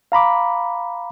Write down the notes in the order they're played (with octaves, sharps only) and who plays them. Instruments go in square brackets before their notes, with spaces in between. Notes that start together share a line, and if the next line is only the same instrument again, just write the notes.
[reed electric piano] F5 A#5 B5 D6